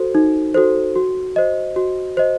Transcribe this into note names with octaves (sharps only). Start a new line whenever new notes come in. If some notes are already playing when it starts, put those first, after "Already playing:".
Already playing: F#4 A4 C5
D#4
F#4 A4 C5
F#4
C5 D#5
F#4
C5 D#5